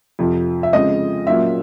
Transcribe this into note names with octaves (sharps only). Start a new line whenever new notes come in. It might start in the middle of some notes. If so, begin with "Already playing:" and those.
F2 C3 F3
E5
C#3 F3 G#3 C4 D#5
A#2 F#3 A#3 C#4 F4 E5